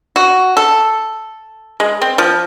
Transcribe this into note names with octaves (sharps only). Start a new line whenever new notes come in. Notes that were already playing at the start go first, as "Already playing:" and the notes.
F#4
A4
G#3
C4
F3